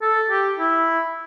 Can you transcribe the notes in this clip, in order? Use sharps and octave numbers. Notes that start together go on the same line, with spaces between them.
A4
G4
E4